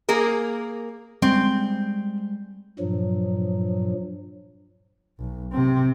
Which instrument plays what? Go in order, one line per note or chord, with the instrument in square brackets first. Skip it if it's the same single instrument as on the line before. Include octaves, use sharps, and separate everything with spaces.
[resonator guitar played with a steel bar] A#3 G#4 A#4
[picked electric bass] G3 G#3 [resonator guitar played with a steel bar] C4
[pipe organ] G2 A#2 F3 F#3
[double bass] B1
C3 C4